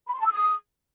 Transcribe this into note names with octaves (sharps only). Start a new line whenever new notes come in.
B5
C6
A5
E6
D#6